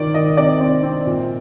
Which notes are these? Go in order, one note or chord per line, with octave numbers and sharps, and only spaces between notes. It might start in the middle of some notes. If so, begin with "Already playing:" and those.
Already playing: D#3 D5
D#3 D#5
C3 D5
C4
C4
A#2